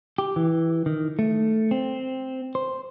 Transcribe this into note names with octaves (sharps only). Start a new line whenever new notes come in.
G4
E3
D#3
A3
C4
C5